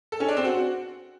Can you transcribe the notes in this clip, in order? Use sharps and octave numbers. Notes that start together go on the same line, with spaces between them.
A4
C#4
D4
C4
F#4